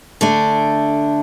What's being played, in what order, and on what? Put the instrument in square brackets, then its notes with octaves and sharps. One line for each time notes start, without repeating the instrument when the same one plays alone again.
[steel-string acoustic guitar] D3 A3 D4